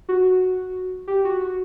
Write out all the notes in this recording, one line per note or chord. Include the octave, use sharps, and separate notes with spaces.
F#4
G4
F#4
F#4